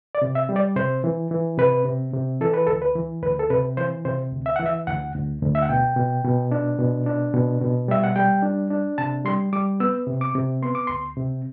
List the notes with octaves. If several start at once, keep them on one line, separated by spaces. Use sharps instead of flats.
D5
C3
E5
G3
D5
C3 C5
E3
E3
C3 B4
C3
C3
E3 A4
B4
D2 A4
B4
E3
D2 B4
A4
C3 B4
E3 C5
C3 C5
D2
E5
E3 F#5
E5
D2 F#5
D2
D2
E5
F#5
B2 G5
B2
B2
D4
B2
D4
B2
B2
G3 E5
F#5
G3 G5
D4
D4
C3 A5
G3 C6
G3 D6
B3 E6
C3
D6
C3
B3 C6
D6
D2 C6
C3